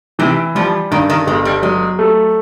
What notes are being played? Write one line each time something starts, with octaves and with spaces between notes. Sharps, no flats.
C3 E3
F3 G3
G2 D#3
D#3
G1 G#3
G3
F#3 G#3
A3